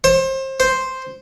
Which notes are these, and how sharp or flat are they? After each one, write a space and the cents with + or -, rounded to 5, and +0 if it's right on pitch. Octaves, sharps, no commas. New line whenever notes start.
C5 +30
C5 +0